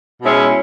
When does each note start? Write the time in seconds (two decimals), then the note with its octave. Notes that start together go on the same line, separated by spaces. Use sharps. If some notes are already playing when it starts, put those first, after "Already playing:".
0.22 B2 G#3 C#4 E4